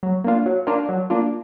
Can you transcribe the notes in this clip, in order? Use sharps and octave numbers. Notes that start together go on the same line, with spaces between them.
F#3
A#3 D4 F4
F#3
A#3 D4 F4
F#3
A#3 D4 F4